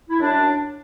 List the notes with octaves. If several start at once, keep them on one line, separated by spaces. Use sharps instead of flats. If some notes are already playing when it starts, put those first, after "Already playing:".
E4
F#2 D4